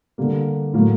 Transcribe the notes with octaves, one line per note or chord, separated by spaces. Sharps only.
D3 G3 A#3
A2 F#3 A#3